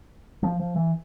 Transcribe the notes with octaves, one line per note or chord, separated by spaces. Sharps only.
F3
F3
E3